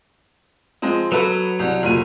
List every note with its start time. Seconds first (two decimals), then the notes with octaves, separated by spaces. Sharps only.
0.82 F3 G#3 C4
1.12 F#3 B3 A4 B4
1.59 C2
1.83 F1 A#2 D#7